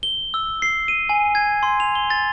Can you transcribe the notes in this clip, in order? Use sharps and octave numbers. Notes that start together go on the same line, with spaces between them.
G7
E6
C7
D#7
G#5
G#6
C6
F7
G7
A6